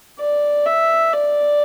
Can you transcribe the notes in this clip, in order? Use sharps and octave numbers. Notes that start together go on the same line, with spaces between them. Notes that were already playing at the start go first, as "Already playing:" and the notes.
D5
E5
D5